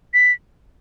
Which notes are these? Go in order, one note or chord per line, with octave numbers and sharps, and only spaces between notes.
B6